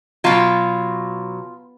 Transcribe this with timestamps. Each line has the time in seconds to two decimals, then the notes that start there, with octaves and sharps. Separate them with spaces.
0.24 B2 F#3 F4